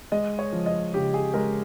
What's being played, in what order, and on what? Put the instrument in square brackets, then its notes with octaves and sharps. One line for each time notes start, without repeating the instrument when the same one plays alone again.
[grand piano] G#3 D#5
C#5
F3
D#5
C#3 G4
G#4
G#3 A#4